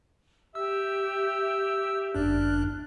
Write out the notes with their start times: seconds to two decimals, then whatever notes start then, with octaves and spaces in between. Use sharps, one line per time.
0.55 G4 E5 E6
2.15 G1 F#2 D4 D5 F6 F#6